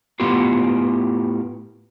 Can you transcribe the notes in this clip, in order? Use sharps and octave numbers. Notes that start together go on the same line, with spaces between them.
A2 B3 F4 G4